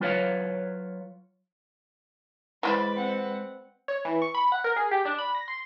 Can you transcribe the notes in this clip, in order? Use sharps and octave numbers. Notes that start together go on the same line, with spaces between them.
F#3 F4 B4 C#5 F5
E3 G#3 F4 B4 C5 D5 B5
C4 F#5
C#5
E3
C#6
B5
F#5
A#4
G#4
G4
D4
B5
A#6
C6